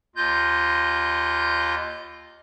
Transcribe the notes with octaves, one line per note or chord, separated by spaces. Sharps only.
D#2 F4 D#5 G6